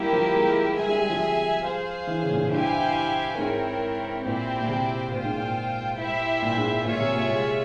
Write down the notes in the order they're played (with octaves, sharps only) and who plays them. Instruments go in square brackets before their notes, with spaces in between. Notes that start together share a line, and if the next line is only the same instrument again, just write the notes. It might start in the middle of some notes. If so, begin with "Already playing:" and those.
Already playing: [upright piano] G3 [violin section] A#3 E4 G4 A#4
[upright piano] F3
G#3
[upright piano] G#3 [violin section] G#4 E5 G#5
[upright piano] G3
G3
F3
[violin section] G#4 C5 F5
[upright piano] E3
C#3
A#2
G#2
[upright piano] G2 [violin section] E4 G4 C5 F5 G#5
[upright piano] G#2 [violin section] C4 E4 A#4 C#5
[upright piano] A#2 [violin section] C4 E4 G4 C5 G5
[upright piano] A#2
C3
[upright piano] A#2 [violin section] F4 C5 G5
[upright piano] G#2
A#2
[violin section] E4 G4 C5 E5
[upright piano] A#2
G#2
[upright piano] A#2 [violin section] F4 G#4 C#5 E5
[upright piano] C3
A#2
G#3